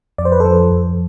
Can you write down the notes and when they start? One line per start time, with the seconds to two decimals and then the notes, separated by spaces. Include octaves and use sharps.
0.18 F2 D5
0.25 C5
0.32 B4
0.40 F3 A4 C5
0.71 F2